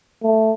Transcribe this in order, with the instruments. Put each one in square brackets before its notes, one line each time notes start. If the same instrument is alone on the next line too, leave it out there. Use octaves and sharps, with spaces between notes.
[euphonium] A3